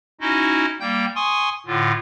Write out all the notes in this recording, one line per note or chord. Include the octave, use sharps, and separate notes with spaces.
C#4 D#4 E4 F#4 D#5
G3 A#3 G5 G6
G#5 C6 C#6 D#6
A2 D3 F4